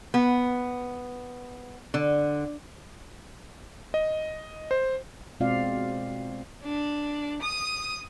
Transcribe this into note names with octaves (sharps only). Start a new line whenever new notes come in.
B3
D3
D#5
C5
B2 G#3 C4 F4 D5 F5
D4
D#6